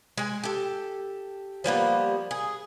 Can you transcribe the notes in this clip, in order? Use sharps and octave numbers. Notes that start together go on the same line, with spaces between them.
G#3 G#5
G4 A4
F3 G3 A#3 B3
G#4